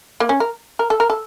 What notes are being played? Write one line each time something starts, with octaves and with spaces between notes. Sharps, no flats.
A#3
C#4
A#4
A#4
A4
A#4
A4